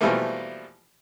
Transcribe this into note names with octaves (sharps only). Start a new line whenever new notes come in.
B2 E3 F3 G3 A3 A#3